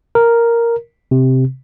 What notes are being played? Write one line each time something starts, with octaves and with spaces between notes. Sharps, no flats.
A#4
C3